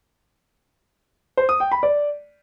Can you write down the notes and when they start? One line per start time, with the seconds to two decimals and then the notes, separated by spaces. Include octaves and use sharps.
1.37 C5
1.49 D#6
1.60 G5
1.71 B5
1.83 D5